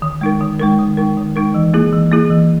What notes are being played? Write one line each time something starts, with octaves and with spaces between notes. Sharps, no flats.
D#3
G#3 D#4 A#4
D#3
G#3 D#4 A#4
D#3
G#3 D#4 A#4
D#3
G#3 D#4 A#4
E3
A#3 E4 G#4
E3
A#3 E4 G#4
E3